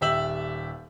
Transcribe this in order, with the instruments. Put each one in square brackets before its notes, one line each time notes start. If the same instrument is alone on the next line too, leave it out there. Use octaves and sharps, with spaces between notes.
[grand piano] D#1 G4 E5 E6 F#7